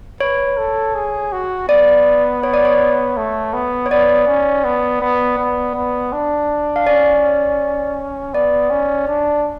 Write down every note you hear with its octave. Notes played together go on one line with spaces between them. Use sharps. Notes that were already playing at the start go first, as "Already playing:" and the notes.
B4 C#5
A4
G#4
F#4
B3 D5
C#5
D5
C#5
A3
B3
C#5
B3 D5
C#4
B3
B3
B3
B3
D4
F5
C#4 D5
B3 D5
C#4
D4